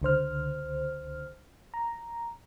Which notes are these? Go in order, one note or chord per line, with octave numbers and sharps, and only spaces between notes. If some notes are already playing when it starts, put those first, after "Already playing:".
C#2 D3 C5 F6
A#5